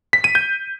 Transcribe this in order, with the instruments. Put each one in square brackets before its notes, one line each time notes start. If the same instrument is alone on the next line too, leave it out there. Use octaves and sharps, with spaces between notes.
[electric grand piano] B6
D#7
G6